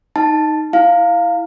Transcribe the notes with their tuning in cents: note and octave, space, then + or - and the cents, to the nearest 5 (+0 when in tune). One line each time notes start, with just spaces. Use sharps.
D#4 +0 A5 +0
E4 +0 F5 +0